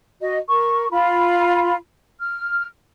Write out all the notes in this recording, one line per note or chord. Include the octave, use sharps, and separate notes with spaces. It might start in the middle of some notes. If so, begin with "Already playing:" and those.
F#4 D#5
A#4 C#6
F4 B5
F6